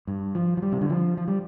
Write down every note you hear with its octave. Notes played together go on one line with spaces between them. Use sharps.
G2
F3
F3
G3
C3
D3
F3
F3
G3